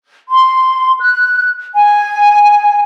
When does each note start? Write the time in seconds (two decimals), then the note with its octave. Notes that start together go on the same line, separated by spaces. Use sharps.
0.29 C6
1.00 F#6
1.75 G#5